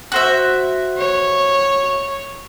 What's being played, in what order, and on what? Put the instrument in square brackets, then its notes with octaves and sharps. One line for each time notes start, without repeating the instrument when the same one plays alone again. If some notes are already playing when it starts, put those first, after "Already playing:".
[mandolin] F#4 C5 E5
[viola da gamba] C#5